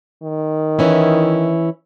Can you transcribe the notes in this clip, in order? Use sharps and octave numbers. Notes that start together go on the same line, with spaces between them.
D#3
E3 C#4 E4